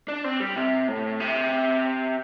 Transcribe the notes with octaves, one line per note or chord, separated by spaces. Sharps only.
D4
C4
G3
C3
A2
C3